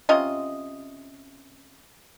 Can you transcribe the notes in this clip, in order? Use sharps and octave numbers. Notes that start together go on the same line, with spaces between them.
C3 C#4 F4 D#5